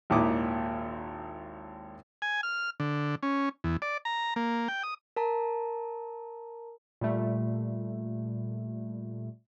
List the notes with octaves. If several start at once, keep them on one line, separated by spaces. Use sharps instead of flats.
G#1 D#2 A#2 E4 D6 D#6
G#5
F6
D3
C#4
E2
D5
A#5
A#3
G5
D#6
A#4 A5 A#5
A#2 G3 A3